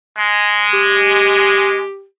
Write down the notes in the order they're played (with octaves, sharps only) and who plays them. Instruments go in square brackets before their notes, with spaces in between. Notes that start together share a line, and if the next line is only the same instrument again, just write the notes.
[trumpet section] G#3
[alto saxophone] G4